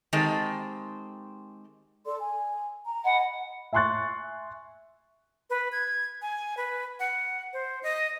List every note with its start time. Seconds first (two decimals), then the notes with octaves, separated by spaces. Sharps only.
0.13 D#3 G#3 C4 G4 A4
2.05 A4 D5 C6
2.20 G#5
2.84 A#5
3.05 D#5 F#5 G#5 B5
3.73 E5 G#5 C6 C#6 F#6 A6
5.50 B4
5.72 G#6
6.22 G#5
6.57 B4
7.00 F#5
7.53 C5
7.83 D#5